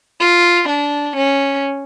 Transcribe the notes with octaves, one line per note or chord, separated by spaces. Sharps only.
F4
D4
C#4